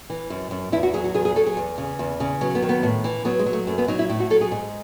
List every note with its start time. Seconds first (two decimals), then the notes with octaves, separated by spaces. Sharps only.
0.10 E3
0.30 F#2
0.51 F#2
0.72 E2 E4
0.83 F#4
0.94 F#3 G#4
1.04 F#4
1.14 E2 G#4
1.25 G#4
1.36 F#3 A4
1.46 G#4
1.57 E2
1.78 C#3
1.99 E2
2.20 C#3
2.41 F#3 B3
2.55 B3
2.62 D#3
2.69 B3
2.83 A2
3.04 E3
3.25 F#3 B3
3.39 G#3
3.46 F#3
3.53 A3
3.67 F#2 A3
3.78 B3
3.88 F#3 D#4
3.99 E4
4.09 A2 E4
4.20 F#4
4.30 F#3 A4
4.41 G#4
4.51 G#2 G#4